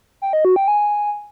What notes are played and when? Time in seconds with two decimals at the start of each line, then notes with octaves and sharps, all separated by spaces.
0.22 G5
0.33 D#5
0.45 F#4
0.56 G5
0.68 G#5